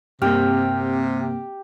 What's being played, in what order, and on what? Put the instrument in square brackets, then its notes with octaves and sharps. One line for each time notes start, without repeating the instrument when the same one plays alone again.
[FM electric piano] G2 A#3 [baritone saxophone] C3 [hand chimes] C4 F6 [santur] G4